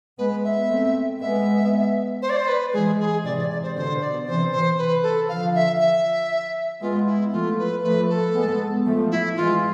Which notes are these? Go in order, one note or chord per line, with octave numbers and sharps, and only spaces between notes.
G#3 B3 B4
E5
A3 C4
G#3 B3 E5
C5
D5
C5
B4
E3 G#3 G#4
G#4
C3 E3 D5
D5
D5
C5
B2 D3 C5
D5
C3 E3 C5
C5
B4
A4
D3 F3 F5
E5
E5
G#3 B3 F4
E4
F3 A3 F4
B4
F3 A3 B4
A4
G#3 B3
F3 A3
E4
E3 G#3 F4